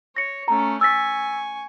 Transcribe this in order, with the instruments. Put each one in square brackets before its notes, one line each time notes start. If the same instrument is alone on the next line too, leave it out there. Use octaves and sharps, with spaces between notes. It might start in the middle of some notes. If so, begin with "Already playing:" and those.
[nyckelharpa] C#5 [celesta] A#6 C#7
[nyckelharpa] A3 C#4 [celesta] A#5
[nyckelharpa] G#5 C#6 [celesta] E6 A6 B6